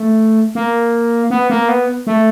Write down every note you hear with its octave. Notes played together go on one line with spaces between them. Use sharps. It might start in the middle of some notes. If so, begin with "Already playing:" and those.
Already playing: A3
A#3
B3
A#3
B3
A3